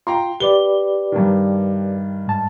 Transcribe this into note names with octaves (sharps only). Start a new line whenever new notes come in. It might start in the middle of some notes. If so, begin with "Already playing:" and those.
F4 G5 A#5 C6
G4 B4 D5 G7
G2 D#3
G#2 A5